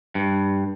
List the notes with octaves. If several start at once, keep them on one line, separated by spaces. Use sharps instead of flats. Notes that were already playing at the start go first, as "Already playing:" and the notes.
G2